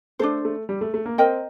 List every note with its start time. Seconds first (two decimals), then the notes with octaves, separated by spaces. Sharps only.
0.19 A3 D4 A4 C5
0.45 A3
0.69 G3
0.81 A3
0.94 A3
1.06 A#3
1.18 C4 A#4 D#5 G5